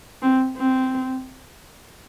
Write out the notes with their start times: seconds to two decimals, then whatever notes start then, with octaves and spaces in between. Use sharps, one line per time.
0.22 C4
0.58 C4